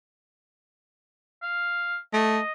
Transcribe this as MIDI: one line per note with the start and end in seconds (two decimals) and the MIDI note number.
1.42 1.96 77
2.13 2.40 57
2.13 2.52 75